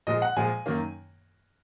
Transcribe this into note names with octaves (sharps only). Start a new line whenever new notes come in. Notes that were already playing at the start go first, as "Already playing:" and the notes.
A#2 F3 G#3 D#5
F#5
A#2 F3 G#3 G#5
F#2 D#3 A#3